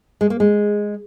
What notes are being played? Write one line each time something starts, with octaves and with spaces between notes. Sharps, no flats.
G#3
A#3
G#3